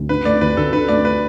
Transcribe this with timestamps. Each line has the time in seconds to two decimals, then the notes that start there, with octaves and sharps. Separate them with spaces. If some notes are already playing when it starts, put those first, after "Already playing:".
Already playing: D2
0.09 D3 B4
0.25 A3 D5
0.41 D2 B4
0.57 D2 A4
0.73 D3 B4
0.88 A3 D5
1.05 B4